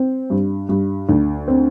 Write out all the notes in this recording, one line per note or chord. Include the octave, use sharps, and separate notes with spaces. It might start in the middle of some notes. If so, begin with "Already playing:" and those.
Already playing: C4
G2
G2
D2
C4